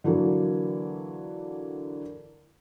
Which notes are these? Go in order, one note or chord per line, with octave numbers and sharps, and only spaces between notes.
D3 E3 F#3 A#3